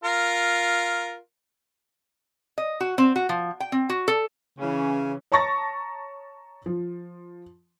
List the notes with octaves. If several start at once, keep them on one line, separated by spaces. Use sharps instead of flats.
F4 A#4
D#5
F#4
C4
F#4
F3
G5
C4
F#4
A4
C#3 E3 C#4
C#5 A5 A#5 C#6 A6 A#6
F3